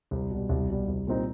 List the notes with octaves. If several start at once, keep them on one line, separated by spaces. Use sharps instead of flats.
C2
B2 G3
C2
B2 G3
C2
A#2 G3 C4 D#4